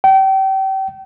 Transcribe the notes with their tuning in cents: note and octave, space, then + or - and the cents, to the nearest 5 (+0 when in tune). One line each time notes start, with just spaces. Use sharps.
G5 -30